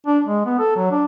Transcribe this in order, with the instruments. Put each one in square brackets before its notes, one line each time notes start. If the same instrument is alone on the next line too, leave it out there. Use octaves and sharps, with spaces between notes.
[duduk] D4
G#3
B3
A4
F#3
D4